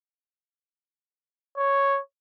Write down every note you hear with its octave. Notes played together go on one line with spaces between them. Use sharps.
C#5